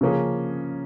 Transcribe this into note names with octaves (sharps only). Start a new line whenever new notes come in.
C#3 F3 A#3 C#4 G#4